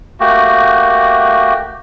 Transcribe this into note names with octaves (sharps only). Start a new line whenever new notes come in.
A3 A#3 F#4 G4